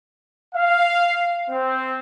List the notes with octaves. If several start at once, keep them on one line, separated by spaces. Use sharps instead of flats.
F5
C4